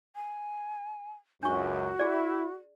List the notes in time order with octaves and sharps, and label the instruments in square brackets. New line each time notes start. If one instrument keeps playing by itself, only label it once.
[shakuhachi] G#5
[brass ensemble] C#2 F#2 [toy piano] D4 C#6 [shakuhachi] F#4
[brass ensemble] E4 [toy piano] G#4 D5